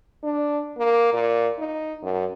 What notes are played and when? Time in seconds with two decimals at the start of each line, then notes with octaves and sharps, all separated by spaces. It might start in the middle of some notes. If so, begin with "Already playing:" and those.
0.23 D4
0.78 A#3
1.13 A#2
1.59 D#4
2.02 F#2